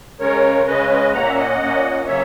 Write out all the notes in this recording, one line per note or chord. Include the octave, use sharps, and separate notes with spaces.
C#3 G#3 C#4 A#4 C#5
C#3 G#3 C#4 B4 D#5
B4 D#5
A#2 A#3 C#4 F#5 A#5
E5
D#5 F#5
A#2 A#3 C#4
C#3 F#3 A#3 C#4 C#5 E5